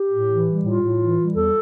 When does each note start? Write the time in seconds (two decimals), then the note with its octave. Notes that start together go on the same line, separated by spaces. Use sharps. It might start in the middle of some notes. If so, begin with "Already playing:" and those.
Already playing: G4
0.11 A2
0.28 E3
0.46 G3
0.63 A2 F4
0.81 A2
0.99 E3
1.18 G3
1.35 E2 A4